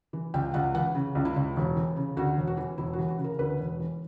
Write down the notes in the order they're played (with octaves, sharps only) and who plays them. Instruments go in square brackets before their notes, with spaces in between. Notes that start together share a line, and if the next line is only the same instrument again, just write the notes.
[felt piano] E3
C#2 G5
C#2 F#5
E3 F#5
C#3
C#2
E4
C#2
E1
E3
C#3
D2 F#4
E1
F#4
E3
E1 E4
F#4
E3
F#4
C#3
A#4
D2 B4
E1
E3